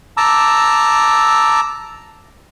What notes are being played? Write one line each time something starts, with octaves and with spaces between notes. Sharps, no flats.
A5 A#5 D6 E6